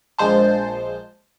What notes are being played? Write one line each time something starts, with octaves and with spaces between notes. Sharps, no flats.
A#1 G#3 C5 A5